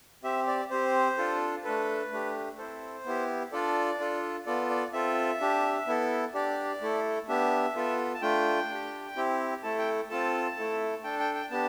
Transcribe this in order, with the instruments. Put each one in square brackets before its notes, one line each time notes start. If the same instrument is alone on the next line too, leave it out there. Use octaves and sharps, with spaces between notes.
[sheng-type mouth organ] C4 G4 E5
D5
C4 G4 C5
D4 F4 A4
A3 D4 A4 B4
A3 D4 G4
C4 E4 A4 C5
B3 E4 G4
D4 F4 A4 D5
D4 F4 A4
B3 F4 A4 D5
D5
C4 F4 A4 E5
D4 G4
B3 E4 A4
D4 G4 D5
A3 E4 A4
B3 D4 G4 E5
B3 F4 A4
A5
A3 D4 F4 G5
D4 G4
C4 E4 G4
A3 E4 A4 A5
G5
C4 F4 A4 A5
A3 E4 A4
D4 A4 G5
G5
G5
B3 D4 G4 A5